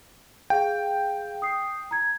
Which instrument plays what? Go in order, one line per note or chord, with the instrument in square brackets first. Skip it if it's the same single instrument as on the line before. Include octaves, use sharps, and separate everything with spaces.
[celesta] G#4 F5 [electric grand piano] G5
[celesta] D#6 C7
A#5 G#6